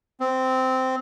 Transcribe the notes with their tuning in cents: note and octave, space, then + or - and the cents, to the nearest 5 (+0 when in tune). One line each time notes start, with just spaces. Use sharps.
C4 -10